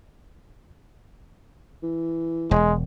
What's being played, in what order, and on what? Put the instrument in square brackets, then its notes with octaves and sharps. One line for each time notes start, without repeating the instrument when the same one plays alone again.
[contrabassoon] E3
[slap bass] E1 [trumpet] G#3